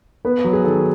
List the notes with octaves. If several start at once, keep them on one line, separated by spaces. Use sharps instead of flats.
B3 B4
F#3
G#4
D#3 A4